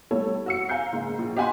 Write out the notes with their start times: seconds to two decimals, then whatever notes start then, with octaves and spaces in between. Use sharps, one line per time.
0.11 G3 A3 A4 C#5
0.46 F#4 E6 C#7
0.69 F5 G#5 A#5 G6 C7
0.93 F#1 G#2
1.19 A#1
1.36 G4 D#5 F#5 G#5 B5 C6